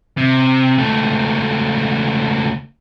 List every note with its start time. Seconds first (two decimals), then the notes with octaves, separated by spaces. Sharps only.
0.17 C3
0.78 C#2 A3